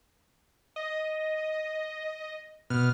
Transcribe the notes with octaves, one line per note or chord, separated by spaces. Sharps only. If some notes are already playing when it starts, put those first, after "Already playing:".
D#5
B2 F6